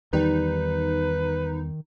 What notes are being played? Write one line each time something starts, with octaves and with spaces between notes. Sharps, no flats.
E2 D#3 G3 D#4 B4